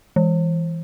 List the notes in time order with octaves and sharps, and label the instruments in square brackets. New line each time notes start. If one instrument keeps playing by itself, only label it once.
[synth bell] E3